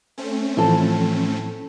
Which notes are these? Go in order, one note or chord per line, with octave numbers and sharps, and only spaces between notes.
A3 C4 C#4
A2 E3 F3 A4 A5